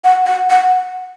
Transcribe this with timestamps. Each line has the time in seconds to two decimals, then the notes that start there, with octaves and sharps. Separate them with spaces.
0.04 F#5
0.26 F#5
0.50 F#5